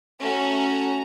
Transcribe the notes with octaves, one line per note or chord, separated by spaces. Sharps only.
A3 C#4 F#4 A#5